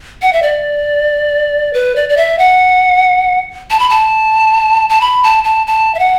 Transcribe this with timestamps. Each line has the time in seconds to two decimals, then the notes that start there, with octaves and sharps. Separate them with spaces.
0.22 F#5
0.33 E5
0.43 D5
1.74 B4
1.96 D5
2.09 D5
2.17 E5
2.39 F#5
3.71 A5
3.79 B5
3.90 A5
4.89 A5
5.01 B5
5.23 A5
5.44 A5
5.67 A5
5.95 E5
5.99 F#5